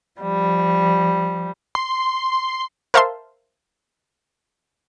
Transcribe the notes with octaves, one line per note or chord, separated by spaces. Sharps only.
F3 G3
C6
A#4 C5 E5 F5 A5 C6